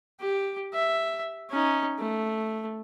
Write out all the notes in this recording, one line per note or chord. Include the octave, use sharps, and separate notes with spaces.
G4
E5
C#4 D#4
A3